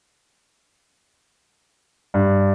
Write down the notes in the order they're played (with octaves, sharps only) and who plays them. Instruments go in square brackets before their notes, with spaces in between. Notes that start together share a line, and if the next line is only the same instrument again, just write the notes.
[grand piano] G2